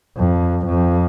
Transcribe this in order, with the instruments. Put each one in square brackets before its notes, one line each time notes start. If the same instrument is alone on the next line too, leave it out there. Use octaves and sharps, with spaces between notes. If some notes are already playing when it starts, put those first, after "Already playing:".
[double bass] F2
F2